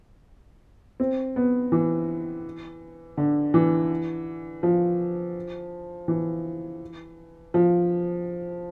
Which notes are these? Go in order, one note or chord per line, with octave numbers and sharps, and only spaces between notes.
C4
B3
E3
D3
E3
F3
E3
F3